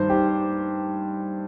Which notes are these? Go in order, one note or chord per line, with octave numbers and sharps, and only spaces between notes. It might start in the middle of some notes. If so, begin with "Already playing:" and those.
Already playing: G2 D#3 C5
G4